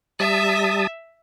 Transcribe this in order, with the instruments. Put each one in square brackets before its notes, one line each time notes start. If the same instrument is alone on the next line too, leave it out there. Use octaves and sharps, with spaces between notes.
[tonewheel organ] G3 A5 D#6 [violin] E5